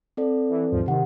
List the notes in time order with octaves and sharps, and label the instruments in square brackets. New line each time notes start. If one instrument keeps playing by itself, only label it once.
[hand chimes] C4 A4 D5
[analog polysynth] E3
D#2 G#2 F3
[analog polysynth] C3 D#3 [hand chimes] G4 F#5